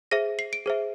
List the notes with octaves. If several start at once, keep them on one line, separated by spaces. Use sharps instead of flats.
G#4 C5 E5 A#6
C7
D7
G#4 C5 E5